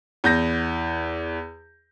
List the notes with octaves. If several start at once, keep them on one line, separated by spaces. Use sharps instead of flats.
E2 G6 A#6